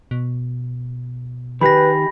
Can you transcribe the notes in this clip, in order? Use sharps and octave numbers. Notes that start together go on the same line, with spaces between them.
B2
D#3 G4 G#4 B4 B5 A#6